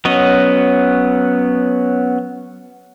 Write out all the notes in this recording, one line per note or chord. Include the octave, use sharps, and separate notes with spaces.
F#3 B3 C#4 D#5